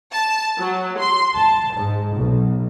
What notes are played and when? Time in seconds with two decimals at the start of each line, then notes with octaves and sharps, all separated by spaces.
0.13 A5
0.59 F#3
1.00 C6
1.35 A5
1.75 G#2
2.16 B1